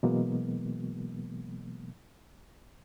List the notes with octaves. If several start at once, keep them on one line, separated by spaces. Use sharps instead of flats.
B2 E3 F#3 G#3 A#3 B3